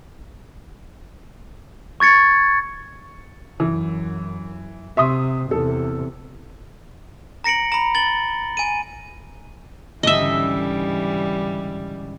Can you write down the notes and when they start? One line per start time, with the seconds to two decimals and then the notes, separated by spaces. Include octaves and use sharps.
2.00 C#6 G#6 A6 C#7
3.60 F#2 E3
4.97 C3 E5 C6 D#6
5.51 E2 C3 A4
7.44 A#5 A#6 C#7 D7 F#7
7.72 A#5 B5
7.95 A6 F#7 G7
8.57 G#5 D#7
10.03 C#2 G#2 D3 E3 G3 D#5 E5